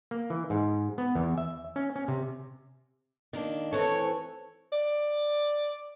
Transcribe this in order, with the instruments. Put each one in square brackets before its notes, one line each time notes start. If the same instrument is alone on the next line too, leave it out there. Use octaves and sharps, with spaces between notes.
[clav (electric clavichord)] A#3
E3
G#2
B3
E2
E5
C#4
C#4
C3
[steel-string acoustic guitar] D#3 A#3 D4
[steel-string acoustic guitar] E3 A3 [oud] C4 A4 [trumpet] C#5
[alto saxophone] D5